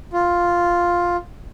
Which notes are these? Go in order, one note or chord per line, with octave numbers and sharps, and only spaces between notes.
F4